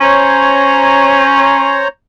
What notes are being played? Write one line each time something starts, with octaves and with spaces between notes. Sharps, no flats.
C#4 C5 C#5 A#5